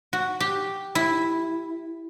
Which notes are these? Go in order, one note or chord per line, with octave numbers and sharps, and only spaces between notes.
F#4
G4
E4